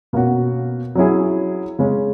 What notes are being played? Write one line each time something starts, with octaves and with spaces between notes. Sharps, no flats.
B2 A#3 C#4 F#4
F#3 C#4 E4 G#4
C#3 G#3 C#4